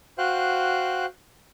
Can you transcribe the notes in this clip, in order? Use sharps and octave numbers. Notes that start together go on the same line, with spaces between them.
F#4 C5 F5 G5 F#6